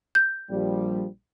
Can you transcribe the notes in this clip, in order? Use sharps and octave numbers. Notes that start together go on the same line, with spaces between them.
G6
A#1 F3 G3